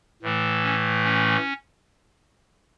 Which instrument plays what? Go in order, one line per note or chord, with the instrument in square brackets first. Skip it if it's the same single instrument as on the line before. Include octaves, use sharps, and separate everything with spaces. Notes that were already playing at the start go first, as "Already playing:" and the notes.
[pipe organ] A2 E3 A3
C#4
C#4